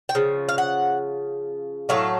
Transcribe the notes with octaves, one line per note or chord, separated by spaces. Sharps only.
G5
C#3 F3
F5
F#5
A2 F#3 A3 F5